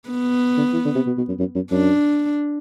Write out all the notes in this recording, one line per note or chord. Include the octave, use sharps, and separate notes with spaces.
B3
D3
E3
D3
C3
B2
B2
F#2
F#2
F#2
F#2 D4